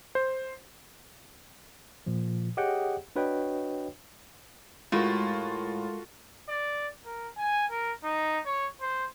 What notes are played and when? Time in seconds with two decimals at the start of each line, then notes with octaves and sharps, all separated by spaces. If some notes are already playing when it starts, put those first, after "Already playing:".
0.15 C5
2.06 A#2 F3
2.57 G4 G#4 C#5 D#5 F#5 G5
3.16 D4 F#4 B4 C#5 D#5 G5
4.92 A2 G#3 F4 F#4 A#4
6.49 D5
7.05 A#4
7.38 G#5
7.71 A#4
8.03 D#4
8.46 C#5
8.81 C5